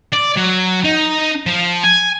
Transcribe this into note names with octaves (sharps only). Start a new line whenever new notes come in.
D5
F#3
D#4
F3
G#5